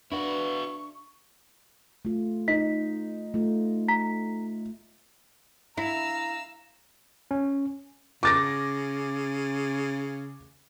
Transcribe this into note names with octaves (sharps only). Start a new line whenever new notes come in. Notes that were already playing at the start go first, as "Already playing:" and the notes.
D4 E4 F#4 B4 C#6
A3 F4
D#4 B6
A3 F4
A#5 B6
E4 F5 A#5 E6
C#4
C#3 D6 A6 A#6